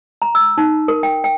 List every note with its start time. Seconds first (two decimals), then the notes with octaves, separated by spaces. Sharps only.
0.22 A#5
0.35 E6
0.58 D#4
0.88 A#4
1.03 G5
1.24 G5